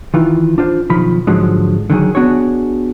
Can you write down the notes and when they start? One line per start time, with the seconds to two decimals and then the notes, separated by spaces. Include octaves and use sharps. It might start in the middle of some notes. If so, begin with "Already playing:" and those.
0.14 D#3 E3 F4
0.58 D4 F4 C5
0.89 B1 D#3 F3 B5
1.27 G#2 D3 F3 F#3 G#3
1.90 D3 D#3 F#3 G#4
2.15 B3 D4 F#4 G#4 C#5